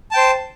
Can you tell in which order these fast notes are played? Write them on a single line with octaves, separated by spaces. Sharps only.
A5 G5 C5